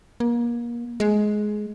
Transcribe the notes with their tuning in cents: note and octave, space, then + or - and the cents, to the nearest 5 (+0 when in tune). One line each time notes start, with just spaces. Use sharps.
A#3 +30
G#3 +15